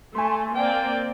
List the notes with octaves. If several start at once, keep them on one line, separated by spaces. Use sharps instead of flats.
A3 G#5 C6
A#3 C4 D5 G5